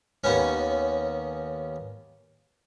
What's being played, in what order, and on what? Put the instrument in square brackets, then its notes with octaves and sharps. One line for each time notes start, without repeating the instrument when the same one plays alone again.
[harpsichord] D#2 B3 C#4